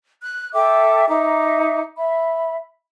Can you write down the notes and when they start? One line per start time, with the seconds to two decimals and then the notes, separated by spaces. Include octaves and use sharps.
0.22 F#6
0.54 A4 E5 G5 D6
1.08 D#4 E5 A#5 D6
1.98 E5 B5